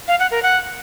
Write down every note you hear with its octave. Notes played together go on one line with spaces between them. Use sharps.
F5
F#5
A#4
F#5